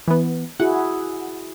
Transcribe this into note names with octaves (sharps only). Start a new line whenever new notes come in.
E3 B3
E4 F#4 G#4 F#5